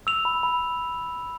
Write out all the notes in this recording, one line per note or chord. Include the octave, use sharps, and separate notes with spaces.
E6 F7
B5
B5